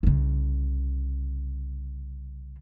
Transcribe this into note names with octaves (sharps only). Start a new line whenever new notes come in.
C2 C#3